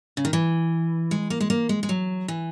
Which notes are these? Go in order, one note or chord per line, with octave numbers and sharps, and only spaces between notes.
C#3
D#3
E3
G#3
A#3
G#3
A#3
G#3
G#3
F#3
E3